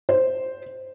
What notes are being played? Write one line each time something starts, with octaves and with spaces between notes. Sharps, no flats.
C5